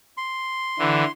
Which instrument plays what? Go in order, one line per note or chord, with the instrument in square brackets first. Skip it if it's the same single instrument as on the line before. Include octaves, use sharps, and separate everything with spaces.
[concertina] C6
[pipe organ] D3 E3